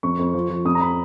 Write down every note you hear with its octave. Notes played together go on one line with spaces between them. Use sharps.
F2 C#6
F2
F3
F3
F2 D#6
A#5
B5